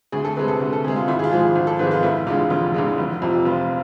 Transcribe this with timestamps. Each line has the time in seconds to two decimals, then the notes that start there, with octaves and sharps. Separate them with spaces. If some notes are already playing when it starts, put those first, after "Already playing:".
0.12 D2 G#4
0.24 A4
0.36 C3 G#3 B4
0.48 A4
0.60 D2
0.73 A4
0.85 C3 G#3 G#4
0.96 F4
1.08 G#1 E4
1.19 G#4
1.24 F4
1.31 G#2 F3 G#3
1.40 G#4
1.56 G#1
1.67 A4
1.79 G#2 F3 G#3 B4
1.91 F4
2.03 F1 E4
2.27 E2 D3 G#3 F4
2.50 F1 F4
2.74 E2 D3 G#3
2.98 F1
3.22 F2 C3 F3
3.45 F1 F4